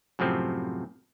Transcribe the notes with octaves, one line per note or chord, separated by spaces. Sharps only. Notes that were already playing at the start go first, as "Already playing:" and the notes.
F#2 A2 C3 F3 C4